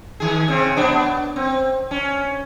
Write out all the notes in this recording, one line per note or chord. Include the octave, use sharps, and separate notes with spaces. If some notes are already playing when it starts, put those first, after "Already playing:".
D#3 G#4
C#3 C4
B2 B3 D4
B3
C4
C#4